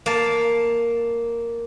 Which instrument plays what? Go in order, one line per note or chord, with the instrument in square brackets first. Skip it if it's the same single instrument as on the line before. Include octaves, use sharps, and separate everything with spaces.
[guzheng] A#3 A5